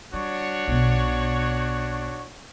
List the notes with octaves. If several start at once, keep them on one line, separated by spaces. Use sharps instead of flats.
G3 D4 F#4 C#5
B1 B2